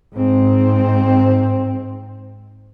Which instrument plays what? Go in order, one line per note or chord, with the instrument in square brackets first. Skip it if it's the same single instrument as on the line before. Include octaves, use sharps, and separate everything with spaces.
[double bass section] G#2 C4